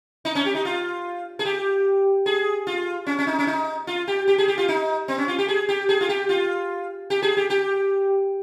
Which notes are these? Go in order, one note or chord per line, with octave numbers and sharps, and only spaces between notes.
D#4
C#4
G4
D#4
F4
G#4
G4
G#4
F4
C#4
C#4
D#4
C#4
D#4
F4
G4
G4
G#4
G4
F4
D#4
C4
C#4
F4
G4
G#4
G4
G#4
F4
G4
F4
G4
G#4
G4
G4